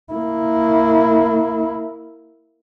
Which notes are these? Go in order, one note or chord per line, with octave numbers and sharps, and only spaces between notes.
A#3 E4